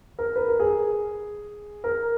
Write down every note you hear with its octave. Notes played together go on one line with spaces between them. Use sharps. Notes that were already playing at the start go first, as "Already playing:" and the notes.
A#4
B4
A#4
G#4
A#4